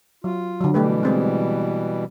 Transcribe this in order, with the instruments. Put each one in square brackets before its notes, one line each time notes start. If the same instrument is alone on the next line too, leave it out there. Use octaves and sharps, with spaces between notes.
[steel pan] F#3 [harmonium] F4
[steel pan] D3 F#3
[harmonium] B2 E3 G3 [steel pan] A3 G4 B4
[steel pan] G#3 C4 G#4